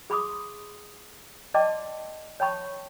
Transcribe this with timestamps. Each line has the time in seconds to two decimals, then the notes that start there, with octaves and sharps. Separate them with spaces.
0.10 G#4 B5 C6 D6 D#6
1.54 D5 D#5 G5 A5 C6 D6
2.40 C#5 G5 A5 B5 C#6